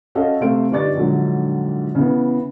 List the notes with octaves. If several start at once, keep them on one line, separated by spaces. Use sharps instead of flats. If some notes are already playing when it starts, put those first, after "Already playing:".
C#4 F#4 A4 D#5 F5
C3 A3 C5 F5 D7
G1 G3 D#4 D5 C#6 A6
A#1 G#2 D3 F#3
C#3 E3 B3